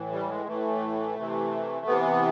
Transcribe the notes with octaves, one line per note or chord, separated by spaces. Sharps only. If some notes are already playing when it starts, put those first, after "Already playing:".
Already playing: A2 E3
G3
G#3
A2 E3 A3
C3 E3
C3 E3 B3